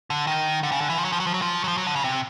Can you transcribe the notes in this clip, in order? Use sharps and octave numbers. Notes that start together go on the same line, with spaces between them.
D3
D#3
D3
C#3
D3
E3
F3
F#3
F3
F#3
F3
F#3
F3
F#3
F3
F#3
D3
C#3
C3